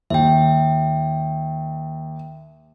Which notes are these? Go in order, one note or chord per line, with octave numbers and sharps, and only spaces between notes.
D#2 E5 G5